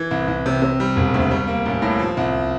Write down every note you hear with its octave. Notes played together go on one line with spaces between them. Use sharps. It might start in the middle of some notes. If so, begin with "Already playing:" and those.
Already playing: E3
C2
C2
C3
C3
G3
E1
D2
G3
A#3
A1
A2
F3
C2